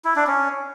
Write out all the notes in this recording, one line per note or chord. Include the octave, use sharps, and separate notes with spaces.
E4
D4
C#4